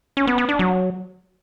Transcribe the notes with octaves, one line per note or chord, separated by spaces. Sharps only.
C#4
B3
B3
D4
F#3